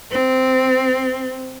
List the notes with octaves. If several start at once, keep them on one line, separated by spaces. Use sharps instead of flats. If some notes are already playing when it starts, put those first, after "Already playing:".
C4